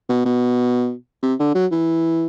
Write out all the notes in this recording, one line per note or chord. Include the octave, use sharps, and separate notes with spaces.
B2
B2
C3
D3
F#3
E3